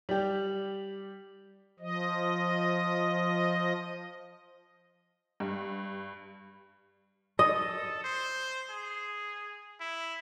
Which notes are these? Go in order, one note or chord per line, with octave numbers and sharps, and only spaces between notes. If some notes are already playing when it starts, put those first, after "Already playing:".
G3 G4
F3 D#5
G2
A4 D#5
C5
G#4
E4